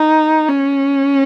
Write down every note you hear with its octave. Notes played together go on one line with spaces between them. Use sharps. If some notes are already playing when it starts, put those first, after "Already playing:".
Already playing: D#4
C#4